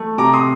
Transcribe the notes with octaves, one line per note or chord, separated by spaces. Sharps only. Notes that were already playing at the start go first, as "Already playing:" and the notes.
Already playing: A3
C3 A#5 D6
C6 D#6